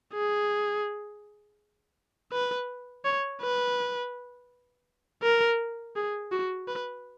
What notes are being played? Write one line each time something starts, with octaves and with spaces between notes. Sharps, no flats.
G#4
B4
C#5
B4
A#4
G#4
F#4
B4